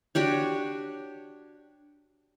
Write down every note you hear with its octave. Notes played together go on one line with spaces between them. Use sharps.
D4 F#4 G4 C#5